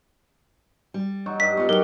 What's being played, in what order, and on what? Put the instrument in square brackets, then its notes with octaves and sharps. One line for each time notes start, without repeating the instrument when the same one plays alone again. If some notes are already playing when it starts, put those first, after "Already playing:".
[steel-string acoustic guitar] G3
[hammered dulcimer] F#3 D#4 C#6
[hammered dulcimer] G2 D#5 [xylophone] B6
[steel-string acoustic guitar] B3 F4 [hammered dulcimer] C#6
[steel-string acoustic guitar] F#3 D#4 D5 [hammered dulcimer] F#4 G4 C#5 [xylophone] A#4 G7